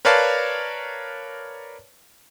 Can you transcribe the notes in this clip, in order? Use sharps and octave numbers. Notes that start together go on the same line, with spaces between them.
A#4 B4 C#5 D5 F5 A5